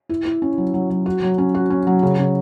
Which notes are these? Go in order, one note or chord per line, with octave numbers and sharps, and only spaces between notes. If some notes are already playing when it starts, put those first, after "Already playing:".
E4
E4
C#4
F#3
F#3
F#3
F#4
F#3
C#4
F#4
C#4
F#3
C#3
C#3